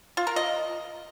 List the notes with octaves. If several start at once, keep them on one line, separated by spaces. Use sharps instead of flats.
F4
A#4
D#5